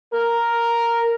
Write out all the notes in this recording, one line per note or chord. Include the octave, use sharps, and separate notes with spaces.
A#4